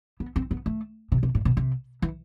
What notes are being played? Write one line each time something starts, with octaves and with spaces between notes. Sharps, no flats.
B3
C4
B3
A3
C3
C3
A2
B2
C3
E3